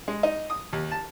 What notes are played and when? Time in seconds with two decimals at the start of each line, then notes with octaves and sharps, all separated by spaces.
0.08 G#3
0.23 D#4
0.50 D#6
0.73 D#2
0.91 A5